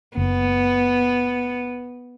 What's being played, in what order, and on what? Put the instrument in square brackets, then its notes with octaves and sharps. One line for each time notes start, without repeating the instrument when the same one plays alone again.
[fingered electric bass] F#1 [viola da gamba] B3